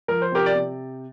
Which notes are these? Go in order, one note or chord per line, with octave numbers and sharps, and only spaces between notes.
F3 A#4
C5
C3 G4 A#4
D5
C3